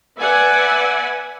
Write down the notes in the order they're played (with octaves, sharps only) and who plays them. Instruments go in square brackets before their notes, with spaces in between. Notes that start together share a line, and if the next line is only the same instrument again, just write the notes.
[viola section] B4 D5 E5 F#5 G#5